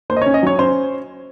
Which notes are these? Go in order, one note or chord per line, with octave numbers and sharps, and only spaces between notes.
A#3 C5
D#5
C#5
C#4
D#5
F#3 C#5
C#4 C5